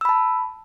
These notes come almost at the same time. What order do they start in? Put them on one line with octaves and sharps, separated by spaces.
E6 B5 A5